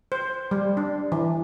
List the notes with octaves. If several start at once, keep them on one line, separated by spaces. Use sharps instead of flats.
C5
G3
D4
E3